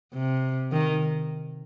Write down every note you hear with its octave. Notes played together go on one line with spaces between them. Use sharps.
C3
D#3